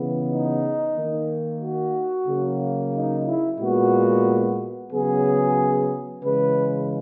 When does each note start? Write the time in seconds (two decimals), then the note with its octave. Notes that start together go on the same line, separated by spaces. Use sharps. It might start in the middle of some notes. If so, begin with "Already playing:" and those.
Already playing: C#3 E3 B3
0.28 D#4
0.95 D#3 A#3
1.60 F#4
2.27 C#3 F#3 A#3
2.93 D#4
3.26 E4
3.58 A#2 G#3 B3 F#4
4.91 C#3 F#3 B3 G#4
6.23 C#3 E3 G#3 B4